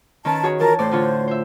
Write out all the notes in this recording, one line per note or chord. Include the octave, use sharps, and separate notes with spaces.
D#3 C#4 B4 A5
F#4 G#4 C#5
E3 F4 A#4 A5
A2 C5 D5
D3 F4 C#5
C5 E5